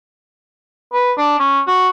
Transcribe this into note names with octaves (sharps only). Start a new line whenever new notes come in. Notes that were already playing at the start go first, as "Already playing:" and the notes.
B4
D4
C#4
F#4